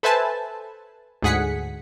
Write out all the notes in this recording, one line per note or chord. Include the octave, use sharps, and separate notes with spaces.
A4 B4 C5 E5 G#5 A5
D2 G#2 G#4 F#5 B6 C#7